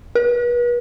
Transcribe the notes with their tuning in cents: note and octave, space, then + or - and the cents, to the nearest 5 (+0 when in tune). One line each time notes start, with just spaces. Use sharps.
B4 -40